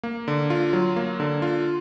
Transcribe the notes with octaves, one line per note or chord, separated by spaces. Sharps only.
A#3
D3
F4
F#3
A#3
D3
F4